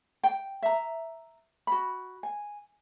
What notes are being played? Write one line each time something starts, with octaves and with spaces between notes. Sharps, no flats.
G5
E5 A#5
F#4 B5
G#5